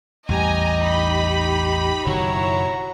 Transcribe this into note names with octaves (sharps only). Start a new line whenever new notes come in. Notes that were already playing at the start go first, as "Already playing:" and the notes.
A1 E2 G3 G4 D#5 G#5 A#5
D#4 B5
F#1 B2 D#3 F#3 E4 C#5 A#5